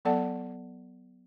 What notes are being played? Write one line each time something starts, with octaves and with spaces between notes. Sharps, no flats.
F#3 B3 A4 D5 F#5 A5